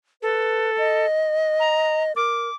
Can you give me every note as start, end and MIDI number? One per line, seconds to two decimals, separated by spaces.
0.22 1.06 69
0.22 0.71 71
0.78 2.15 75
1.60 2.03 82
2.16 2.49 70
2.16 2.55 86